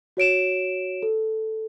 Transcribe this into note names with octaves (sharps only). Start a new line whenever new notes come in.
F#4 C#5 D7 E7
A4